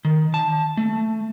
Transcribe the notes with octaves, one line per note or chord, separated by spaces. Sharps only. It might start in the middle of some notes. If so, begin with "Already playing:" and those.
D#3
A5
A3